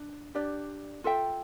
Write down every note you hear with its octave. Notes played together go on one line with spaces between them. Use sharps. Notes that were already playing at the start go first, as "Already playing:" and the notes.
Already playing: D4
D4 G4 D5
F4 A4 E5 G5